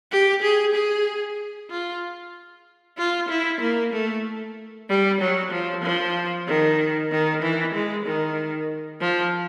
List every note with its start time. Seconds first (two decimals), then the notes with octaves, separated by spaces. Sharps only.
0.12 G4
0.43 G#4
0.74 G#4
1.71 F4
2.98 F4
3.29 E4
3.61 A#3
3.93 A3
4.89 G3
5.21 F#3
5.52 F3
5.83 F3
6.47 D#3
7.11 D#3
7.43 E3
7.75 G#3
8.06 D#3
9.01 F3